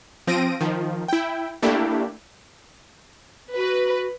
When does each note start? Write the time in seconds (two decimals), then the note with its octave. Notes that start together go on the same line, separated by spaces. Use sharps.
0.27 F3 C4 A#6 D7 D#7
0.61 D#3 F3
1.08 E4 G5
1.62 A3 A#3 D4 E4 G4
3.55 F#4 B4